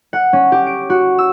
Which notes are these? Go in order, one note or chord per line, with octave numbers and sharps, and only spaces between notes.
F#5
C#4
G4
D7
F#4
E6